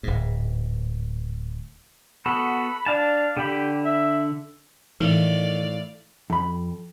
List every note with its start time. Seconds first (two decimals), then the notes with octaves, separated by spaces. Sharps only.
0.03 D1 G#2
2.26 B3 F#4 A4 B5
2.86 D4 F5 A5
3.37 D3 G4 B5
3.85 E5
5.00 A2 D#3 E3 D5 F5
6.30 F2 B5